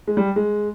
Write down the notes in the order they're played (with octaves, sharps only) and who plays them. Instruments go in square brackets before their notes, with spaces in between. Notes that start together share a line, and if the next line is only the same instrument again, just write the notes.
[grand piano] G#3
G3
G#3